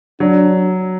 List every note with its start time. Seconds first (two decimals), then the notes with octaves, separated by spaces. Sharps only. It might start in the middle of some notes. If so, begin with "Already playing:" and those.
0.20 F#3 D4